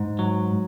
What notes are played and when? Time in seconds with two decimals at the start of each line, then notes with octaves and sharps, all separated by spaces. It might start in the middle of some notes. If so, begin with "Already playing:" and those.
Already playing: G#2
0.19 F#3